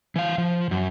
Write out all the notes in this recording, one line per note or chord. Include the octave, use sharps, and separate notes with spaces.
E3 F5
F3
F#2